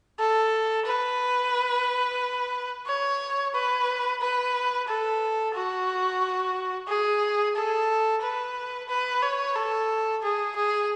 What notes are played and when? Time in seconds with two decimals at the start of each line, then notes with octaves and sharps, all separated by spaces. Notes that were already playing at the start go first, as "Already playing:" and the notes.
0.19 A4
0.86 B4
2.87 C#5
3.54 B4
4.21 B4
4.87 A4
5.54 F#4
6.88 G#4
7.55 A4
8.22 B4
8.89 B4
9.22 C#5
9.55 A4
10.22 G#4
10.56 G#4